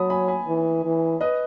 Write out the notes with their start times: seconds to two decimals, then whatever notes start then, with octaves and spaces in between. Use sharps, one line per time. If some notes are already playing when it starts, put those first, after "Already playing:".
Already playing: F#3 A5 B5 D#6
0.10 G#5 B5
0.28 G#5 B5
0.47 E3
0.84 E3
1.21 B4 D#5